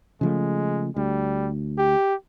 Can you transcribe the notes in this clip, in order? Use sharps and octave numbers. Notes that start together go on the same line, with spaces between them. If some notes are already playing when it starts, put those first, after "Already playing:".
C#3 F3 G#3 A3
D2 G3
G4